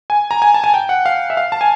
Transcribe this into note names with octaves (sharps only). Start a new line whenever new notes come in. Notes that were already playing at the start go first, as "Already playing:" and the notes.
G#5
A#5
G#5
A5
G#5
G5
F#5
F5
E5
F5
A5
G#5